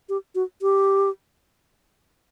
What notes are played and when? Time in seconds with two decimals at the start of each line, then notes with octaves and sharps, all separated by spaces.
0.09 G4
0.35 F#4
0.62 G4